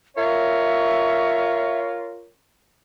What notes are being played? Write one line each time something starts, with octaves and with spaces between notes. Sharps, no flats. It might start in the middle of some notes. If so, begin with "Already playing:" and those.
F4 A#4 C#5 E5